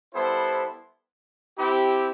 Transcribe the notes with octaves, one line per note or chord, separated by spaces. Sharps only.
G3 B3 E4 A4 C5
C4 E4 G4